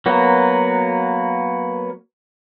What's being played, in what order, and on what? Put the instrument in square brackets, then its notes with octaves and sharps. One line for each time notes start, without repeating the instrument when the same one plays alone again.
[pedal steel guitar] F#3 A#3 B3 F#4